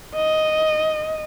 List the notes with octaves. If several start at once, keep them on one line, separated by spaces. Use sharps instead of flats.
D#5